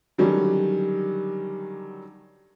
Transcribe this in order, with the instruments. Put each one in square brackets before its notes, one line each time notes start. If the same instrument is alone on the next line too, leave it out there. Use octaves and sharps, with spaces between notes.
[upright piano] D3 D#3 F#3 G3 C#4